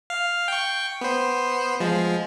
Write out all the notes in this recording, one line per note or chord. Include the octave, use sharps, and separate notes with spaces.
F5
G5 C#6
B3 C5
F3 G#3